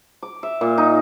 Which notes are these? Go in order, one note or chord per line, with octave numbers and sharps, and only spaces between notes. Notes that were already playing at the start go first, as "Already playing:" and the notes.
D6
E5
A#2
D#4